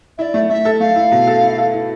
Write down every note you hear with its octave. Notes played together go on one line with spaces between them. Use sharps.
E4 D5 E5
A3
A3 E5
A4
A3 F5
E4
B2
A4
E4
A4
E4